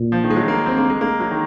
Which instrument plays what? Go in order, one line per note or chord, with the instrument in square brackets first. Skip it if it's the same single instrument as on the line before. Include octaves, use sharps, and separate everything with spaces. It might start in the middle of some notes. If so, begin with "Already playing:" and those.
Already playing: [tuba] A#2
[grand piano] F3
D#3
G#3
F#3
A#3
C4
A#3
G#3
A#3
F#3
D#3